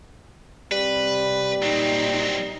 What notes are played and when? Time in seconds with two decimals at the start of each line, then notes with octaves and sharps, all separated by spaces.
0.72 C3 G3 B4
1.62 A#2 F#3 C4 D#4